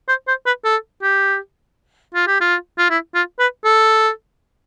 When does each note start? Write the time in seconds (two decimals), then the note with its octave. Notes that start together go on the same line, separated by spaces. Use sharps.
0.08 C5
0.28 C5
0.46 B4
0.65 A4
1.03 G4
2.15 F4
2.27 G4
2.41 F4
2.78 F4
2.90 E4
3.14 F4
3.39 B4
3.64 A4